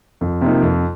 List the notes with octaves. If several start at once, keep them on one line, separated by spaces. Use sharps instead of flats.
F2
C3 F3 A#3 D#4
F2